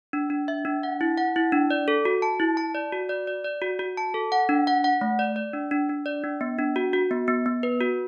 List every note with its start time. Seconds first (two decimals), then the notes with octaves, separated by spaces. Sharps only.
0.13 D4
0.30 D4
0.48 E5
0.65 D4
0.83 F#5
1.01 E4
1.18 F#5
1.36 E4
1.52 D4
1.71 D5
1.88 A4
2.05 F#4
2.22 A5
2.40 E4
2.57 A5
2.75 D5
2.93 F#4
3.09 D5
3.27 D5
3.44 D5
3.62 F#4
3.79 F#4
3.97 A5
4.14 A4
4.32 F#5
4.49 D4
4.67 F#5
4.84 F#5
5.01 A3
5.19 D5
5.36 D5
5.53 D4
5.71 D4
5.89 D4
6.06 D5
6.24 D4
6.41 B3
6.58 D4
6.76 F#4
6.93 F#4
7.11 B3
7.28 B3
7.46 B3
7.63 B4
7.81 F#4